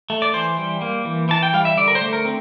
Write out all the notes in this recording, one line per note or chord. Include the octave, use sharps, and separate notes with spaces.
A3
D5
E3 C5
G3
A#3
E3
E3 A5
G5
G3 F5
E5
D3 D5
A#4
C5
A3
A#4
C4